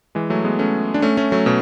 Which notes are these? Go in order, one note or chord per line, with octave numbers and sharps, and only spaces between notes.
E3 G#3
F#3 A3
G#3 B3
A3 C#4
D4
A3 C#4
A3 C#4
F#3 A3
B2